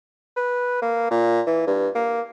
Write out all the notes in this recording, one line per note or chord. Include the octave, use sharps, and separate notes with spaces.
B4
A#3
A#2
E3
G2
A#3